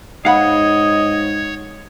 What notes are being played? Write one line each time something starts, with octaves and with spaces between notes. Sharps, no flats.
G#2 C#5 D#5 F5 F#5 B5